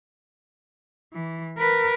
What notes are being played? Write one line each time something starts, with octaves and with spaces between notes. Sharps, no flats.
E3
A#4 B4